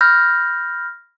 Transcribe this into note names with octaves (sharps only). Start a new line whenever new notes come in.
B5 F6 G6 A#6